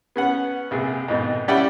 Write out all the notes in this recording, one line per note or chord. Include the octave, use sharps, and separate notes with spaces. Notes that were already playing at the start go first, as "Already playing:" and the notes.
B3 C#4 F#5
A#1 C3 G#4
F2 G#2 B2 D#3
G3 C#4 E4 D5 F#5 G5